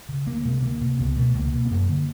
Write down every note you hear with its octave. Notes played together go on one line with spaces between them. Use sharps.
C#3
D2 A#3
C3 G#3
D2 A#3
C3
C#2 B3
B2 A3
C#2 A#3
B2
B3
F#2 A#3
D3